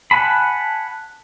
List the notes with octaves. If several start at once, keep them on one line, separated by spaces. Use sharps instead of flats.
F#5 G#5 A5 B5